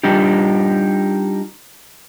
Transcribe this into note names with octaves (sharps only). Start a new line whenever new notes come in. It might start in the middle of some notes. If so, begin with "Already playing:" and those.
G3 D4 D#4 F4 G4